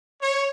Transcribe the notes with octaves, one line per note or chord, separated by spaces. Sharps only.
C#5